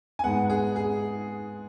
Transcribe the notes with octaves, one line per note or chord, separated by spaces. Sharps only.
G#5
G#2 G#3 B3 F#5
G#4
G#4